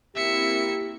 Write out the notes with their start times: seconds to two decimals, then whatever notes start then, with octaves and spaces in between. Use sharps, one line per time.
0.16 A#3 C4 E4 G4 E5 C#7